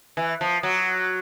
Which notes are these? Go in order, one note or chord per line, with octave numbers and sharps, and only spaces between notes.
E3
F3
F#3